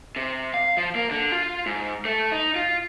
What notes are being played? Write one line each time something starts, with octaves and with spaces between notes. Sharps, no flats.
C3
F5
F3
A#3
D3
F4
G#2
A3
D#4
F4